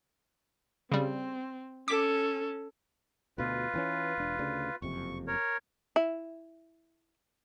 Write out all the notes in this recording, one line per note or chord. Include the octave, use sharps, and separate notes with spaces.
C#3 G3 C4
C#4 A4 D6 B6
D2 B2 F4 B4
G2 E3 C#4
E1 D4
D2 C#3 D4
F#1 F2 C3 C#6
A#4 C#5
E4